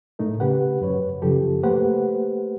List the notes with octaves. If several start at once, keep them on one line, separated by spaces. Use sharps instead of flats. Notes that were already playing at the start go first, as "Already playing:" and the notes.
A2 A3 D#4 A#4
C#3 G4 B4 F#5
F#2 B4 C#5
F#2 C#3 F3 G4 A4
A3 A#3 G4 B4 C5 F#5